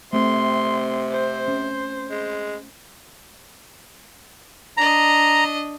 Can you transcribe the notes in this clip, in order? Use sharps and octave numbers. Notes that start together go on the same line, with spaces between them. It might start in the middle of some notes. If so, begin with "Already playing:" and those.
C3 A3 C4 C6
C5
C#4
G#3
D4 D#5 A#5